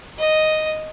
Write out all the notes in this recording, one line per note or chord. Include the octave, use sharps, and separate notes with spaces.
D#5